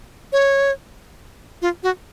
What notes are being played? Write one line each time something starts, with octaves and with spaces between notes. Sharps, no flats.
C#5
F4
F#4